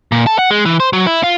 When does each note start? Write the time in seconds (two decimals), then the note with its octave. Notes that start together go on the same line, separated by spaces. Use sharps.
0.12 A#2
0.27 A4
0.39 F#5
0.51 G#3
0.65 E3
0.80 C5
0.93 F#3
1.07 E4
1.23 F4